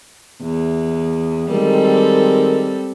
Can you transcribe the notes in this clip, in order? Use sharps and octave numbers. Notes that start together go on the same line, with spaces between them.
E2
D#3 G3 G#3 C4 A4 A#4